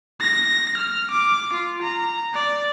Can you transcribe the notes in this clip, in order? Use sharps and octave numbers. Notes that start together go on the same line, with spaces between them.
A#6
F6
D6
F4
A#5
D5